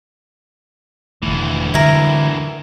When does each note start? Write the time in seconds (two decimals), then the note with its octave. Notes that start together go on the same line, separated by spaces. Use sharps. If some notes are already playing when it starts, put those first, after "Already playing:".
1.23 E1 D2 D#3 E3 A3
1.74 D3 G3 G#3 E4 A#4